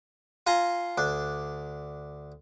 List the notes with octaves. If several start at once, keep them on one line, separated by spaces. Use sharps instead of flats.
F4 G#5 A#5 C6
D2 D4